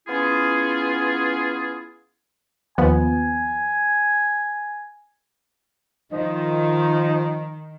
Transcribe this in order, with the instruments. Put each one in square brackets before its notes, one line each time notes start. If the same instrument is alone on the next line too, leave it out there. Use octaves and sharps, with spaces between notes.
[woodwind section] B3 C#4 E4 F4 G#4
[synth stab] D#2 F3 B3 [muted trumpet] G#5
[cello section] D#3 [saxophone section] F3 D#4